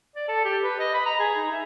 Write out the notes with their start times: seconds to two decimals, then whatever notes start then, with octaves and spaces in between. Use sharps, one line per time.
0.16 D5
0.28 A4
0.45 G4
0.63 B4
0.80 D#5
0.94 B5
1.06 A#5
1.19 G#4
1.37 D#4
1.52 E5